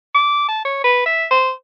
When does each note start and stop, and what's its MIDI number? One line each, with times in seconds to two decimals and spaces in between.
0.15 0.48 86
0.48 0.63 81
0.65 0.83 73
0.84 1.04 71
1.06 1.25 76
1.30 1.51 72